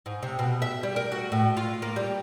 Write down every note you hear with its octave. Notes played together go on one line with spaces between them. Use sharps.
G#2
C3
B2
E5
G3
A#4
F#4
A2
F4
A#3
G3